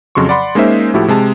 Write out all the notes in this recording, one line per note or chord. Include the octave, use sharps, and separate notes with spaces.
F2 C#3 F#3 C6 C#6
D5 F#5 B5 C6
G#3 A#3 C#4 D#4 C5 E5
A2 F3 E4 F#4 G4 A4
C3 G#3 A5